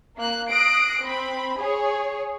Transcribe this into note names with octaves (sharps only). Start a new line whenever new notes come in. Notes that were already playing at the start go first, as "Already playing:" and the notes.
A#3 F#6
D#6 F#6 A#6 C7 D7
C4 B5
G#4 C#5